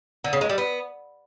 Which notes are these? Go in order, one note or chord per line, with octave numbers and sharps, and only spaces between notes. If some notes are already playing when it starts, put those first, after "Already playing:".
D3
C#3
G#3
G3
B3